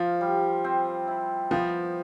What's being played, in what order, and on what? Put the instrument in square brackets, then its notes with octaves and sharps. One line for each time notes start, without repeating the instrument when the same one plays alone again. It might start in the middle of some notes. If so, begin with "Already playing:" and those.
Already playing: [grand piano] F3 [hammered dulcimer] F4
[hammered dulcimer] G3
C4
E4
[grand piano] F3 [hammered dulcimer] B3